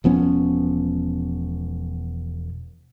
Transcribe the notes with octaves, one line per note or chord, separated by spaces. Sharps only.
E1 F3 B3 C#4